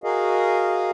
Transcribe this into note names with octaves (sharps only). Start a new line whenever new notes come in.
F#4 G#4 A#4 D#5 F5